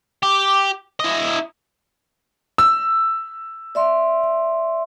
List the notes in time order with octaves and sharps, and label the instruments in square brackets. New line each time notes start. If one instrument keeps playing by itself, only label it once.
[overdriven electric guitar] G4
E4 D#5
[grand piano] E6
[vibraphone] D5 E5 C6